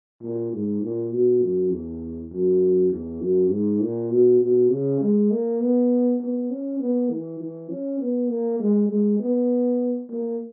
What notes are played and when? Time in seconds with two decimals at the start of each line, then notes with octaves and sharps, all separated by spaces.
0.22 A#2
0.52 G#2
0.82 A#2
1.12 B2
1.42 F#2
1.72 E2
2.31 F#2
2.91 E2
3.21 F#2
3.51 G#2
3.82 A#2
4.11 B2
4.41 B2
4.71 C#3
5.01 G#3
5.31 A#3
5.61 B3
6.21 B3
6.51 C#4
6.80 B3
7.10 E3
7.40 E3
7.70 C#4
8.00 B3
8.29 A#3
8.60 G#3
8.89 G#3
9.20 B3
10.09 A#3